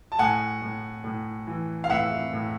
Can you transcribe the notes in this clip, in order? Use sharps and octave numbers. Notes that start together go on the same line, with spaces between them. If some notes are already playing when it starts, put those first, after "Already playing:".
A5
A2 F#5 G#5
A2
A2
E3
F5
A2 E5 F#5
A2